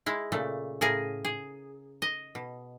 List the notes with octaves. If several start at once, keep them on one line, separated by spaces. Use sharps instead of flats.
G#3 E4
A#2 C#3 A3
A2 C#3 G#4 A#4 G#5 A#5
G#4
D#5
B2